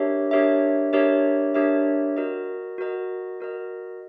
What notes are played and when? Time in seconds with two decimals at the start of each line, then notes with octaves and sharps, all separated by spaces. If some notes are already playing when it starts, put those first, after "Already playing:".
Already playing: D4 G4 A#4 C#5 E5
0.31 D4 G4 A#4 C#5 E5
0.93 D4 G4 A#4 C#5 E5
1.54 D4 G4 A#4 C#5 E5
2.17 F#4 A#4 D#5
2.78 F#4 A#4 D#5
3.40 F#4 A#4 D#5